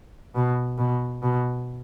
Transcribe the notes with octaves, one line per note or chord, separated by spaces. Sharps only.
B2
B2
B2